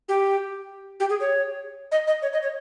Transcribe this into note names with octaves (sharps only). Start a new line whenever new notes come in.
G4
G4
G#4
C#5
D#5
D#5
C#5
D#5
C#5